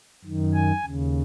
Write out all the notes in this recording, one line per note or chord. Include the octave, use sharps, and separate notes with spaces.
F#2 D#3
G#5
D#2 C#3